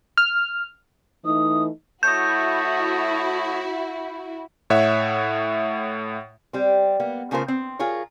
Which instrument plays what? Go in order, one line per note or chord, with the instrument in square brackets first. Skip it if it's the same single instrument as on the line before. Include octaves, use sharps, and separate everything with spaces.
[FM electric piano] F6
[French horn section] E3 A3 D#4 [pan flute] D#6
[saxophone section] A3 C#5 D#5 [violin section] E4 F#4 [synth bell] G6
[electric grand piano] A2 C#5 E5 F#5
[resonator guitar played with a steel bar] G3 C4
A#3 B3
C#3 A3 B3 F4 A#4 C5
C4
F4 G#4 A#4 C#5